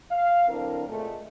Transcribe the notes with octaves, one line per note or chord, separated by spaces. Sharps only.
F5
D3 F#3 C4 D4 E4 A#4
A#2 G#3 A3